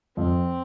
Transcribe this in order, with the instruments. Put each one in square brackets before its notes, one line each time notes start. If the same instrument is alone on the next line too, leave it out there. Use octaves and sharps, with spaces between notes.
[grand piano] F2 [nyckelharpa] C4